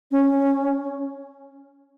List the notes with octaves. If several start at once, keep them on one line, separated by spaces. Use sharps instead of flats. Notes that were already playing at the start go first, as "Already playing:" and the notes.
C#4